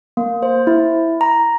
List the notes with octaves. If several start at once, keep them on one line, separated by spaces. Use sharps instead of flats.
A#3
C5
E4
A#5